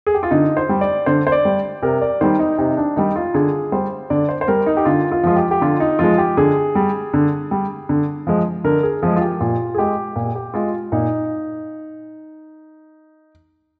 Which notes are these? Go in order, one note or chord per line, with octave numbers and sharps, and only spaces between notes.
G#4
G4
F4
D3 D#4
C5
G3
D5
D3 C5
C5
D5
G3
C3 A#4
D5
D#3 G3 C5
D#4
C3 D#4
D4
D#3 G3 D#4
F4
D3 G#4
G3 C5
D3 D5
C5
C5
G3 A#4
D#4
G4
D3 F4
F4
F3 G#3 F4
G4
G4
D3 F4
D#4
F3 G#3 F4
G4
D3 G#4
G3
D3
G3
D3
F3 G#3
D3 A#4
G#4
F3 G#3 G#4
F4
G4
A#2 F4
G#4
G#3 G4
A#2
G4
G#3 F4
A#2 D#4